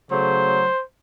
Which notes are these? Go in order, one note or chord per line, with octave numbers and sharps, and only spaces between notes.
C#3 F#3 A3 C5